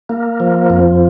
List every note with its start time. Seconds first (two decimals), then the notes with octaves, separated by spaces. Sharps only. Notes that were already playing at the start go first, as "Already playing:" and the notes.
0.09 A#3
0.40 F3
0.70 F2